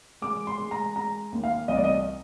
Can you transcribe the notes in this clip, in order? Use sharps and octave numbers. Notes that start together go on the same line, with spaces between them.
G#3 D6
C6
G#3
A#5
G#3 A#5
D#2
F5
C2 D#5
D5
D#5